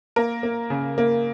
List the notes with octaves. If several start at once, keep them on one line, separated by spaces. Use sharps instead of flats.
A#3 A#4
A#3
C#3
A#3